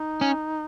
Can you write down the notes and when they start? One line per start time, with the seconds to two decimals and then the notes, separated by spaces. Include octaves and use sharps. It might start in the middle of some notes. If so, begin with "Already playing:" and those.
Already playing: D#4
0.21 C#4